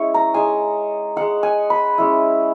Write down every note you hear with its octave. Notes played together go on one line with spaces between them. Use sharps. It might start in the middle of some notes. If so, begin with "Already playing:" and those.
Already playing: G#3 C#4 E4 C#5
A#5
G#3 D#4 G#5
G#3 D#4 F#5
G#5
B5
G#3 C#4 E4